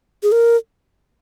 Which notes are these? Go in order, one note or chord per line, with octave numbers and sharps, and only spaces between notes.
G#4
A#4